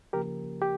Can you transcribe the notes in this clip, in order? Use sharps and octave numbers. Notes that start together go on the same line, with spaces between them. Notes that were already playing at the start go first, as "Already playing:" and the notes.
C#3 F3 A#3 G4 A#4
G4